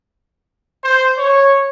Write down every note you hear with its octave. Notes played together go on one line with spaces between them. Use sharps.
C5
C#5